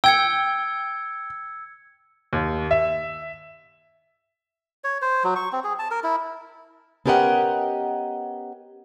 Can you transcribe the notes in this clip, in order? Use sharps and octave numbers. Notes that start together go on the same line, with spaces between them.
G5 E6 G#6 C#7
D#2
E5
C#5
C5
F#3
C#6
C4
G#4
A5
A#4
E4
B3 C#4 G4 A#4 D#5 F#5